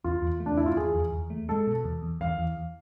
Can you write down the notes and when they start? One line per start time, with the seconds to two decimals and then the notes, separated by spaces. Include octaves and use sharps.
0.04 E2 F4
0.22 E2
0.40 A3
0.46 D4
0.57 E2 E4
0.66 F4
0.76 E2 G#4
0.95 E2
1.12 E2
1.30 A3
1.48 G#3 A4
1.67 B2
1.84 E2
2.03 E2
2.21 E2 F5
2.39 E2